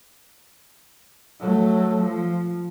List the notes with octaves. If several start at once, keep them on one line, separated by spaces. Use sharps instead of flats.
F#3 A3
F3